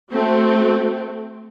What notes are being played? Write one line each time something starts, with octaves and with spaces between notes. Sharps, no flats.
A3 C4 F#4